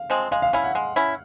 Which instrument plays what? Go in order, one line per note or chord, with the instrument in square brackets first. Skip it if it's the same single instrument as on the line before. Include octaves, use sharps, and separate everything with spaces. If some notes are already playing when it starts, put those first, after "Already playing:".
Already playing: [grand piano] F5
[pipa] F3 G#3 C4
[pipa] G#3 [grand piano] F5
[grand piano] F5
[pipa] C#4 E4 [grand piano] F5
[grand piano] F#5
[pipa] G#3
C#4 E4